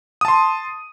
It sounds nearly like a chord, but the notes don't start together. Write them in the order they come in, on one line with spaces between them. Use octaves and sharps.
D#6 A5 C6